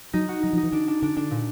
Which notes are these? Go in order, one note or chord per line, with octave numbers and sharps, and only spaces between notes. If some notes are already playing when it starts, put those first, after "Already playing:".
F#3 D#4
F#4
F#3 D#4
F3
D#4
E3
D#3 D4
D4
D3 D4
D3 D4
A#2